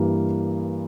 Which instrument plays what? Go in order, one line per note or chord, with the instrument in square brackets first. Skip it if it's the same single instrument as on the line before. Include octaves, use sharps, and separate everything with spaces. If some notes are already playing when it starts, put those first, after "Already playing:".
Already playing: [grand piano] G2 E3 G3 A#3